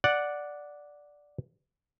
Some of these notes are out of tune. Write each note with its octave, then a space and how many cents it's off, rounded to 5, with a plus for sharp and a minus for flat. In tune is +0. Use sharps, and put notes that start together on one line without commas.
D5 +0 F#5 -5